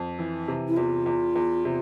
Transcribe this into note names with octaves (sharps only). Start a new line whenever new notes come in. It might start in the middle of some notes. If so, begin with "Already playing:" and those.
Already playing: F2
E3
C3
E4
E2 F4
E2
E2
C3